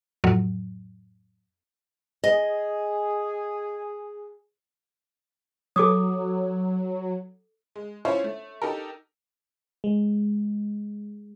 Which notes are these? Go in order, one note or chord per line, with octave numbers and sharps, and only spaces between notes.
F2 A2 F#3
G#4 D#5
F#3 A4 D6 D#6
G#3
C#4 E4 F4 C5 C#5
A3
D#4 G4 A4 A#4
G#3